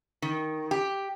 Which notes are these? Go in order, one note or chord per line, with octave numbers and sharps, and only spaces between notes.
D#3
G4